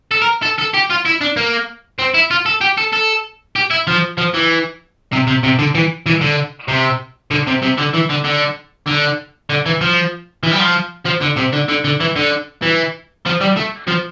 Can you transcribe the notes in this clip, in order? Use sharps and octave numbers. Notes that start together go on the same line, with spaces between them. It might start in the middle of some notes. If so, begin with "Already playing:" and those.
A4
A#4
A4
A4
G4
F4
E4
D4
A#3
C4
E4
F4
A4
G4
A4
A4
G4
E4
F3
F3
E3
C3
C3
C3
D3
E3
E3
D3
C3
D3
C3
C3
D3
E3
D3
D3
D3
D3
E3
F3
E3
G3
F3
F3
D3
C3
D3
D3
D3
E3
D3
E3
F3
G3
A3
F3